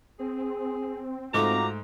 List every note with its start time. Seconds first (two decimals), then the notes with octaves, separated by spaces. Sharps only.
0.20 C4 G#4
1.34 G#2 A3 F4 F#4 A#5 D6